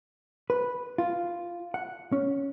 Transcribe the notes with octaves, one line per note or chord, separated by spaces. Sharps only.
B4
F4
F#5
C#4